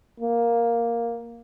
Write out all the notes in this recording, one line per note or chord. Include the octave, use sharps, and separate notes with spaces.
A#3